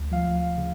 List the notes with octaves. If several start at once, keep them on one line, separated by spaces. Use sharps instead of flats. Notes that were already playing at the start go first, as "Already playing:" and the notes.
Already playing: D2
F3 F5
C#3